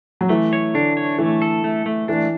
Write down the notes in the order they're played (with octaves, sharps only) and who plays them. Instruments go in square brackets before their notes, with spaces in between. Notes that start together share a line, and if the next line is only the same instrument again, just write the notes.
[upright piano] F#3
[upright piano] E3 [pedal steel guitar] A3
[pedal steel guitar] C#5
[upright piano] D3 [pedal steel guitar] D4
[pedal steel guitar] C#5
[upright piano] E3 [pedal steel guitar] A3
[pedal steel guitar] A4
A3
A3
[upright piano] E3 [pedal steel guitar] D4